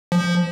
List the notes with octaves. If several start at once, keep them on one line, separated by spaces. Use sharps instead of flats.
F3